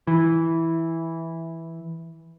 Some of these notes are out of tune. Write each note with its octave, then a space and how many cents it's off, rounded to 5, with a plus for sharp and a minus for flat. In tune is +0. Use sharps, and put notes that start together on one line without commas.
E3 -5